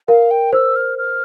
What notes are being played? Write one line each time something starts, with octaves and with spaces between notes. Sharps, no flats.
A#4 F5
G5
C5 E6
F6
F6